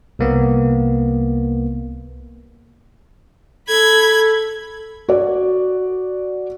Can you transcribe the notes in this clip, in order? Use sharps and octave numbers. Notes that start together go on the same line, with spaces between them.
C2 A#3 B3
A4 B5 G#6
F#4 D5